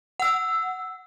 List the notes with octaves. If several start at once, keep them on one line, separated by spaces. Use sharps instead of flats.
F#5 E6